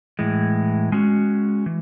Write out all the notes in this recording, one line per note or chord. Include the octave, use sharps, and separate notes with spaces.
A2 E3 G#3
G#3 C#4 F#4
E3